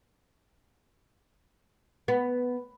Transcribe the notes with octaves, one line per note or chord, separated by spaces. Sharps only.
B3